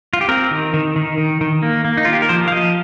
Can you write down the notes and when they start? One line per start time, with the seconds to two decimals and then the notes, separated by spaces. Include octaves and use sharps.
0.13 F4
0.21 G4
0.28 C4 A#4
0.51 D#3
0.74 D#3
0.96 D#3
1.18 D#3
1.41 D#3
1.62 A#3
1.85 A#3
1.97 D#4
2.05 A#3 F4
2.13 G4
2.22 A#4
2.29 F3 C5
2.48 F5
2.52 F3 D#5